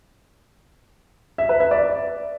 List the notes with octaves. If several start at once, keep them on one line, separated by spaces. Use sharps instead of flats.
E5
B4
E5
D5